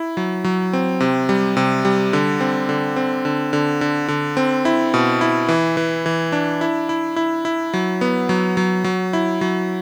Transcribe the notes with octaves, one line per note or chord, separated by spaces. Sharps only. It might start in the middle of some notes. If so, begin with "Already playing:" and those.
Already playing: E4
F#3
F#3
C4
C3
G3
C3
G3
D3
C4
D3
C4
D3
D3
D3
D3
C4
E4
B2
E4
E3
E3
E3
D4
E4
E4
E4
E4
F#3
B3
F#3
F#3
F#3
E4
F#3